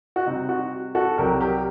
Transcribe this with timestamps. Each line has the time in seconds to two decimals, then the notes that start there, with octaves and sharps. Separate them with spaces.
0.16 F#4
0.26 C3 G3 C4 D#4
0.49 F#4
0.95 F#4 A4
1.18 C2 C3 F#3 G4 A#4
1.41 G4 A#4